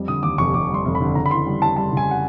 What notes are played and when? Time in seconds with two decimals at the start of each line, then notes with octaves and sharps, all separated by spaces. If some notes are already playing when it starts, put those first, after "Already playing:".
Already playing: F2 G3
0.08 D3 D#6
0.23 D#2 D6
0.38 F1 C#6
0.54 F1 D6
0.69 G3 C6
0.85 F1
0.95 B5
1.01 D3
1.15 C#3 A#5
1.26 B5
1.30 E3 C6
1.46 G3
1.61 E3 A5
1.76 G3 A5
1.92 C#3 G#5
2.11 F#5